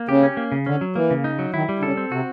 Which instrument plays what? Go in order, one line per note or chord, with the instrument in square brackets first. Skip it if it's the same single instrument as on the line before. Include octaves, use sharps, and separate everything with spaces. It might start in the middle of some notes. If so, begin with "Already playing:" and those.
Already playing: [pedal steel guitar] A#3
[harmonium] C#3 [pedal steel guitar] G4
[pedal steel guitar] C#4
A#3
C#3
[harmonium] D3 [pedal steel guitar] C#4
[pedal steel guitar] F#3
[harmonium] E3 [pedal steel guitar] A#3
[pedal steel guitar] C#3
D#4
F#3
[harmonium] D#3 [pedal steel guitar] E4
[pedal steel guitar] G3
[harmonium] D3
[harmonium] C#3 [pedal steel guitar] A4
[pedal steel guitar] C4
[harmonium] C3 [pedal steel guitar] F#4